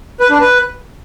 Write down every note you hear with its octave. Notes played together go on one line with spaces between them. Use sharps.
B4
D4
B4